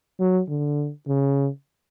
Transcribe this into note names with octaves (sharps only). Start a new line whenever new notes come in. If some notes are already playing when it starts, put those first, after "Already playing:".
F#3
D3
C#3